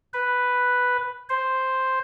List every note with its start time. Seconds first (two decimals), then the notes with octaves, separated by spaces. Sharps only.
0.14 B4
1.29 C5